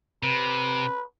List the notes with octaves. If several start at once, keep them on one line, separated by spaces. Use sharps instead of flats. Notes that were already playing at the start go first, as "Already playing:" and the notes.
C3 B4